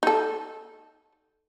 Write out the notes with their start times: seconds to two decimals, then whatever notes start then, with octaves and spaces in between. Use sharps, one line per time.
0.03 D#4 A4